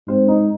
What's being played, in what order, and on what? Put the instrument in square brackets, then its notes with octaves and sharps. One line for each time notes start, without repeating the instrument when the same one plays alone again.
[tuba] G#2 [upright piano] C4 C5
[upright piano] D#4 D#5